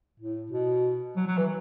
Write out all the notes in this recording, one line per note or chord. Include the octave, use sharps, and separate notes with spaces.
A2
B2
F#3
F#3
E3